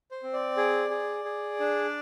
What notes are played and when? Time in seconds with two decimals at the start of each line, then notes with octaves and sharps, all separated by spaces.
0.11 C5
0.23 C4
0.33 D5
0.57 G#4
0.90 G#4
1.25 G#4
1.60 D4